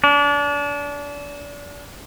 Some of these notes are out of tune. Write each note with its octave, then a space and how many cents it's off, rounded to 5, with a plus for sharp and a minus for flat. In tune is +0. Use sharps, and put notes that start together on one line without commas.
D4 -30